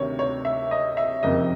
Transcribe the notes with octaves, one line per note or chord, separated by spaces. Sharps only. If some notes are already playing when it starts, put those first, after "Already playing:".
Already playing: D2 C3 D#3 C#5
C#5
E5
D#5
E5
F#1 F2 C3 D#3 D#5